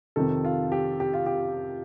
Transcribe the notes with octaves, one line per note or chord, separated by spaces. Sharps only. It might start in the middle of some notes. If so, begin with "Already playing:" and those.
F2 C3 D#3 A4
F4
G4
G4
F4
G4